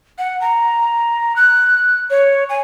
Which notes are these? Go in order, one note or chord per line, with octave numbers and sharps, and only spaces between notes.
F#5
A#5
F#6
C#5
G#5